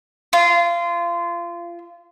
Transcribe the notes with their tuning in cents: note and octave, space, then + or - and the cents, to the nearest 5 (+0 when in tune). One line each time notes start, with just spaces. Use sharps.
F4 -25